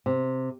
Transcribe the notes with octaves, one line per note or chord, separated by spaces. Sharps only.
C3